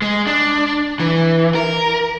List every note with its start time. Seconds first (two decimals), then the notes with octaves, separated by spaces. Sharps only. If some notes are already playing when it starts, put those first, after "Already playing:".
0.02 G#3
0.27 D4
0.99 E3
1.55 A#4